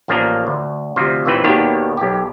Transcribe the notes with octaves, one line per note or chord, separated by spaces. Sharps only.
A1 F3 A#3 D4 A#5
D2
D2 C3 F3
D#2 A#2 E3 C4 B4
D#2 B2 D#3 B3 D4 G4
B1 G4